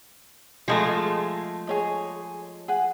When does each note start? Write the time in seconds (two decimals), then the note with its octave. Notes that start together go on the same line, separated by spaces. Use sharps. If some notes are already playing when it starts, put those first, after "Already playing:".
0.68 F3 G#3 A3 G#4 D#5 A#5
1.67 G#4 C#5 D#5
2.68 G#4 F#5